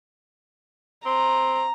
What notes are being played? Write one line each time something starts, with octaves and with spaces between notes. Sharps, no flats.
C4 A#5